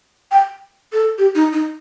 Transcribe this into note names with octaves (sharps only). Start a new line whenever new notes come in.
G5
A4
G4
D#4
D#4